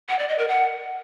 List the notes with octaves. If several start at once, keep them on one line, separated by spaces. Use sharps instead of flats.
F#5
D5
D#5
A#4
F#5